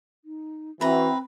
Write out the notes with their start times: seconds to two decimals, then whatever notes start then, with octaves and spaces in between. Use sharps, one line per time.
0.25 D#4
0.81 E3 C4 F#4 B4 E5 A#5